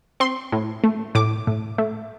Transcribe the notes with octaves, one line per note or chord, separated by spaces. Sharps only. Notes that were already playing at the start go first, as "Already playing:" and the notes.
C4 C6
A2
A3
A2 D6
A2
A3